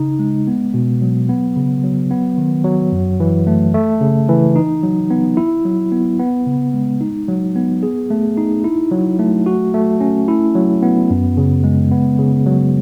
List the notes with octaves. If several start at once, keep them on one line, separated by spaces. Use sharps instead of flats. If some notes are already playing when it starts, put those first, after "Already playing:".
Already playing: C#3 D#4
G#3
B3
B2
F#3
B3
C#3
F#3
B3
D#3
F#3
F#2
E3
A3
A3
C#3
E3
D#4
F#3
B3
E4
F#3
B3
B3
C#3
G#3
D#4
F#3
B3
G#4
A3
D#4
E4
F#3
A3
F#4
A3
C#4
E4
F#3
B3
F#2
C#3
G#3
B3
C#3
F#3